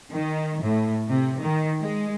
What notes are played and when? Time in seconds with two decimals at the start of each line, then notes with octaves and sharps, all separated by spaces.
0.13 D#3
0.63 A2
1.09 C3
1.43 D#3
1.82 G#3